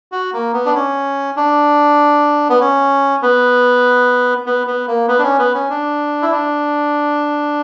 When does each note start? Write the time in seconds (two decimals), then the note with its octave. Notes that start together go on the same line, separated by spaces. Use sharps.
0.12 F#4
0.33 A#3
0.53 B3
0.66 D4
0.74 C#4
1.36 D4
2.49 B3
2.60 C#4
3.22 B3
4.46 B3
4.67 B3
4.87 A#3
5.08 B3
5.19 D4
5.23 C#4
5.39 B3
5.54 C#4
5.70 D4
6.22 E4
6.32 D4